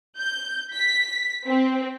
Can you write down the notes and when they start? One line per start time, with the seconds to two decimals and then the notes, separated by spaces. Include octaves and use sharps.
0.18 G6
0.74 B6
1.46 C4